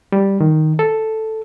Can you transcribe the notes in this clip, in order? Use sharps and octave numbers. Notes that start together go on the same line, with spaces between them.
G3
D#3
A4